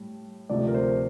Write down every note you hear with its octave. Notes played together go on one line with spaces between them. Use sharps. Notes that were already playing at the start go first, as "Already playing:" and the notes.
Already playing: A2 G3
D2 C3 F3 A3 D5
A#4
C5